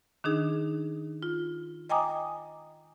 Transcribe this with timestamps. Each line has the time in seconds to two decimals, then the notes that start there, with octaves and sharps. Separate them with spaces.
0.24 D#3 D4 D#4 G#4
1.23 F4
1.90 D#5 G5 G#5 A#5 D6 D#6